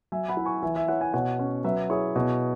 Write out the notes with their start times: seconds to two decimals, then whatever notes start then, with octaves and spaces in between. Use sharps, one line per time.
0.12 F#3 E5 G#5
0.29 F#5 B5
0.37 E4
0.45 G#5 C#6
0.63 E3 E5 G#5
0.76 E5 G#5
0.88 E4 C#5 F#5
1.01 E5 G#5
1.14 B2 C#5 F#5
1.39 C#4
1.64 F#3 B4 E5
1.90 E4 G#4 C#5
2.16 B2